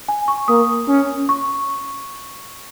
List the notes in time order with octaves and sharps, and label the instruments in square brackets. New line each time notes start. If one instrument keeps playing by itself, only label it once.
[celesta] G#5
C#6
[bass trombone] A#3 [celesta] D#6
[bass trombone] C#4
[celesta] C#6